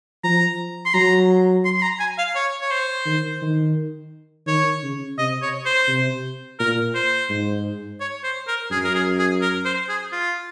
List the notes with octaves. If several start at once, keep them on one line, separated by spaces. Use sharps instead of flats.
F3 A#5
C6
F#3 A#5
C6
C6
A#5
G#5
F5
C#5
C#5
C5
D#3
D#3
D#3 C#5
C#3
C3 D#5
C#5
C5
C3
A#2 A#4
C5
G#2
C#5
C5
A#4
F#2 G#4
A#4
G#4
G#4
A#4
C5
G#4
F4